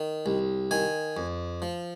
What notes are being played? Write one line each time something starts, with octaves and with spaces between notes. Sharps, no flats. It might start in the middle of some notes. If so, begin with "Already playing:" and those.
Already playing: D#3
C2
D#3 G#5
F2
F3